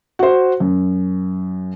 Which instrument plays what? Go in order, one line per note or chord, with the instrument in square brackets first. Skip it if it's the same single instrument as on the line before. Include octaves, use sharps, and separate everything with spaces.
[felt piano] F#4 C5
F#2